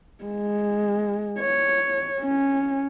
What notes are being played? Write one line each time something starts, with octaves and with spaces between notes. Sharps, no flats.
G#3
C#5
C#4